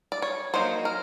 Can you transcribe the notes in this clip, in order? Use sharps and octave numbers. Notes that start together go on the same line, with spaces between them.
D5
C#5
F#3 A#3 D#4 C5
A#4